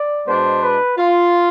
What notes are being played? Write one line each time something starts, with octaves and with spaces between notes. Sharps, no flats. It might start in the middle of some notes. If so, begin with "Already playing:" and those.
Already playing: D5
B2 G#3 B3 D4 C5
B4
F4